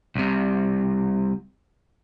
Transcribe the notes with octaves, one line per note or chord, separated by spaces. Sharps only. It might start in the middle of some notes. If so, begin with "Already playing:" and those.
C2 C3